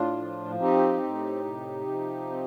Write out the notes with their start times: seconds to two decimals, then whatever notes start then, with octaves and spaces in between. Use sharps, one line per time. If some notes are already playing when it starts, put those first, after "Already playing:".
Already playing: A2 D4 F4
0.18 F3
0.60 C4 D#4 G4
1.02 A2
1.44 C3
1.87 F3
2.30 C4